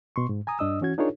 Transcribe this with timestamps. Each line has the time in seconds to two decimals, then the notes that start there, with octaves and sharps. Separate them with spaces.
0.16 B2 C6 C#6
0.29 G#2
0.47 G#5 A#5 D#6
0.59 G2 D4 D#5 D#6 E6
0.81 E3 C#4 F#4 G#6
0.98 D4 D#4 F4 G#4 A#4 C#5